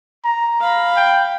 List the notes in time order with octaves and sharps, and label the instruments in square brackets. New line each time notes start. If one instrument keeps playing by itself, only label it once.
[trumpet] A#5
[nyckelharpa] F5 B5
[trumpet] G5